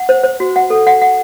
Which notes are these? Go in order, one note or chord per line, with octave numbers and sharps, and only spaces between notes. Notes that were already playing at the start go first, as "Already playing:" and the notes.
Already playing: F#5
C5
C5
F#4
F#5
A4
F#5
F#5